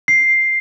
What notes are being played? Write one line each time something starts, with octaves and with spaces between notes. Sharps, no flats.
C7